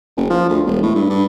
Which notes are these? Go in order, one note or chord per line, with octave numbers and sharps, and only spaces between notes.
F#1
F3
D2
E1
A2
G2
G2